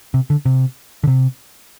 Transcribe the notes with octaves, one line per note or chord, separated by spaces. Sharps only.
C3
D3
C3
D3
C3